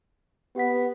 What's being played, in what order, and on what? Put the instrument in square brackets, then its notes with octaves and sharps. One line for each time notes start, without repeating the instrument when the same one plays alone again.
[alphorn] B3 [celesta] G4 F#5 B6